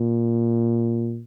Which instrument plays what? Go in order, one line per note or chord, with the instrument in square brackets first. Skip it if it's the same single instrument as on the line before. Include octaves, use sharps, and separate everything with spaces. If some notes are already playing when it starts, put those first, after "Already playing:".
Already playing: [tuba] A#2